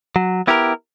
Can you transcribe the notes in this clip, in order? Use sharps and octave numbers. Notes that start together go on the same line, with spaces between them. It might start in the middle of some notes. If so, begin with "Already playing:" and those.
F#3
B3 E4 G4 A#4